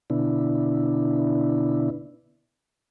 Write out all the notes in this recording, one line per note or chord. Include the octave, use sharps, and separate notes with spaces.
B2 D3 B3 D4 E4